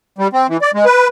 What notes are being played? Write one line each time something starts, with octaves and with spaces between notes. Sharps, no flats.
G3
C4
E3
D5
G#3
B4